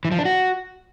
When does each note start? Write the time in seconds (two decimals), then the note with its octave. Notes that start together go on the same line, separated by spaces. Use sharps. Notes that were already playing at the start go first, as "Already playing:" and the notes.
0.05 E3
0.12 F3
0.18 D4
0.25 F#4